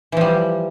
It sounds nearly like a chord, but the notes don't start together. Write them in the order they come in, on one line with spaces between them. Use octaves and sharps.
E3 F3 G3